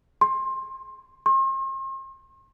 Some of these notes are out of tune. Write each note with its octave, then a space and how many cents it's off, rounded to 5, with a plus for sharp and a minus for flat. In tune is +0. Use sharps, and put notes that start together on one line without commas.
C6 +20
C6 +40